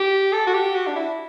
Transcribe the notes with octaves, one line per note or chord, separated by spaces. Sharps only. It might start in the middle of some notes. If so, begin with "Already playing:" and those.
Already playing: G4
A4
F#4
G4
F#4
D4
E4